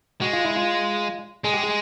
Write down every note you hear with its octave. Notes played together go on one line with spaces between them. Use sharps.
G#3 F#4
F4
E4
F4
G#3 G#4
G4
G#4